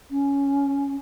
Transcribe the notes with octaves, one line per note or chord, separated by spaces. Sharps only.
C#4